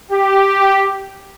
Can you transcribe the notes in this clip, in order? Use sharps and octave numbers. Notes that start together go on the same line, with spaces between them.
G4